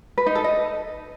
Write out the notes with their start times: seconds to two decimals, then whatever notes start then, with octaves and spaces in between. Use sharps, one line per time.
0.18 B4
0.26 D#4
0.35 A4
0.44 D#5